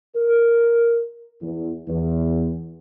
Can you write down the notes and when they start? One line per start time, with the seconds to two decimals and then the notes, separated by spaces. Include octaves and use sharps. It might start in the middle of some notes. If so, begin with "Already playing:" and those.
0.16 A#4
1.42 E2
1.88 E2